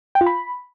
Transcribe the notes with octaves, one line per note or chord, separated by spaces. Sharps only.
G5
F4
B5